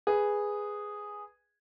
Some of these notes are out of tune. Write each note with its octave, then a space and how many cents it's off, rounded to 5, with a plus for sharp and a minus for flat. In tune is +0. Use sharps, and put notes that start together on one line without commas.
G#4 -5 B4 +0